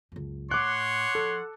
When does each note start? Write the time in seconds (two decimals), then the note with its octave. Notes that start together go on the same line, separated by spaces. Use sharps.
0.12 C#2 F#2
0.51 A2 C#5 F#5 C6 D6 F#6
1.15 F3 A4